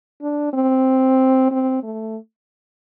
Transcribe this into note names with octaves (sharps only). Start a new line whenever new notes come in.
D4
C4
C4
A3